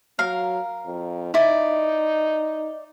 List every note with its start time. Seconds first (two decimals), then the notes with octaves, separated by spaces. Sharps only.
0.19 F#3 A#4 F5
0.86 F2
1.34 D#4 E4 D5